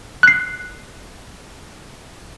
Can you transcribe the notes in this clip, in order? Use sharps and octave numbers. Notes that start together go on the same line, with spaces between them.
F#6 C7